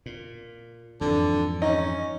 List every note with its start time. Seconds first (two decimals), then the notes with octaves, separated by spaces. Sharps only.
0.06 A#2
1.01 F2 G#2 D3 E3
1.62 C#4 D#4